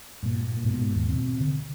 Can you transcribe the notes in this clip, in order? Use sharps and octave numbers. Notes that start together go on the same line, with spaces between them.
G2 A#2
G#2 B2
D#2
B2 C4
D3